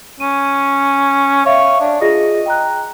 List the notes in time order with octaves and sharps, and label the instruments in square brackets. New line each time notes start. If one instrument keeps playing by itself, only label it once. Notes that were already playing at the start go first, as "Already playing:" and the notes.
[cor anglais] C#4 [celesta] D#7
[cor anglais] C#5 [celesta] E5 F5 C#6
[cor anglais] D4
[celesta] F4 G#4 A#6 [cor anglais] D#5
[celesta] G5 A#5 F#6